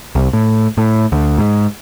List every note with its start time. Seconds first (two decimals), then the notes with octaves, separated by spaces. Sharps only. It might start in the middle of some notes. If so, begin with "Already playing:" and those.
0.15 C2
0.33 A2
0.77 A2
1.12 D2
1.38 G#2